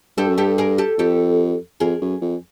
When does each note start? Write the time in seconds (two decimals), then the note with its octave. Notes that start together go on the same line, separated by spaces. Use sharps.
0.17 G2 G4 A4
0.28 F#2
0.38 G2 G4 A4
0.58 G#4 A#4
0.78 G4 A4
0.98 F2 G4 A4
1.80 F2 G#4 A#4
2.01 F#2
2.22 F2